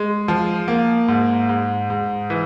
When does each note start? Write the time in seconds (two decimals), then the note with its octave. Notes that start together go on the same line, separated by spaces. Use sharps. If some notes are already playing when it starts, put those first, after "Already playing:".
Already playing: G#3
0.28 F3
0.68 A#3
1.08 G#2
1.49 G#2
1.90 G#2
2.30 E3